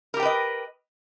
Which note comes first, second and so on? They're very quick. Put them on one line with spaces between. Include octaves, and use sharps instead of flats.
A#4 G4 G5 B4 D#5